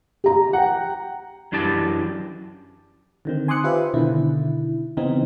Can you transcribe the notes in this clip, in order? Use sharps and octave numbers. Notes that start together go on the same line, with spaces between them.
G4 A#5
F#5 G5
F#2 E3 D4 G4 A5
D3 D#3 C4
G#5 C6 D6 D#6 F#6 C#7
F4 G4 B4 C5 E5
B2 D3 D#3 E4
C#3 E3 B3 C4 D#4